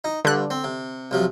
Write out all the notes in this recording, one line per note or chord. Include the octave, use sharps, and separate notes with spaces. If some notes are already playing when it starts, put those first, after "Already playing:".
D#4
G2 D3 F#6
C4
C3
B1 C3 F3